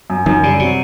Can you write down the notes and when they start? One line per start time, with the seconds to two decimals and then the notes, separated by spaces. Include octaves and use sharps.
0.10 F#2
0.26 F#2 D#3
0.43 C#3 G3
0.59 C3 F#3